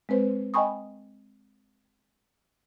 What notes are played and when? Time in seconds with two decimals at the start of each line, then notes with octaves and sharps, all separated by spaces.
0.09 G#3 C4 B4 C5
0.54 D#5 G5 G#5 B5 C#6 D#6